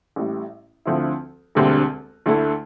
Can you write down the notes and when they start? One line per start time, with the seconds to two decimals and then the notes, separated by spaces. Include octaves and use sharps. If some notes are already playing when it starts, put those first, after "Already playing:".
0.16 A1 A2 G3
0.85 D2 D3 F3 C4 E4
1.55 E1 D2 D3 G3 C4
2.26 D2 D3 A3 E4 A4